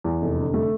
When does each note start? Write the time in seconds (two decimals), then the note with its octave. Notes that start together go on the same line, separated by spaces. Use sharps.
0.04 E2
0.22 F1
0.38 D3
0.54 A3